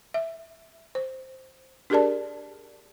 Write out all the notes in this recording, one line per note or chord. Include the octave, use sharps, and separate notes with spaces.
E5
C5
D4 G4 G#4 A#4 D5 A5